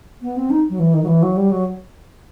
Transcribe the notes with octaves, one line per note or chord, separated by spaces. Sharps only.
B3
C4
D#4
F#3
E3
D#3
F#3
E3
F#3
G3
F#3